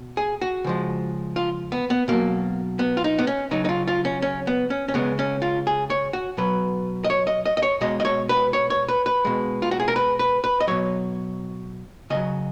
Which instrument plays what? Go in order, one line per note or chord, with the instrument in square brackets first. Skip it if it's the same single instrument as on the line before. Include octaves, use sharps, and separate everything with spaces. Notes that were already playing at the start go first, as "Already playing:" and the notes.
Already playing: [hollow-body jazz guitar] B2
G#4
F#4
C#3 F3 G#3
F4
B3
B3
B2 F#3 A#3
B3
F4
D#4
B3
C#4
C#3 F#3 D#4
D#4
F4
F4
C#4
C#4
B3
C#4
C#4
C#3 G#3 B3
C#4
F4
G#4
C#5
F#4
B2 F#3 B4
D#5
C#5
D#5
D#5
D#5
C#5
B2 G#3 D#5
D#5
C#5
B4
C#5
C#5
B4
B4
B2 G#3
F4
F#4
G#4
A#4
B4
B4
B4
D#5
B2 F#3 C#5
C#3 F#3 D#5